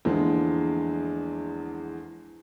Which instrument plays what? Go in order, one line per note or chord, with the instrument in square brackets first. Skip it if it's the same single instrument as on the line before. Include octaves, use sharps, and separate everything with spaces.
[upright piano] E2 D3 E3 F3 G#3 A#3